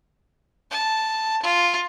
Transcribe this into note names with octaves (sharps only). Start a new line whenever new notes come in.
A5
F4